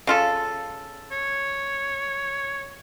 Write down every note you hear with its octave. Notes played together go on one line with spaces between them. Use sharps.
C#3 F4 A4
C#5